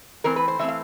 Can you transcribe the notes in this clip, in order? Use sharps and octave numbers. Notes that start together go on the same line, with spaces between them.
E3 A3 C4 A#4
B4
C5
E3 A3 C4 E5
F5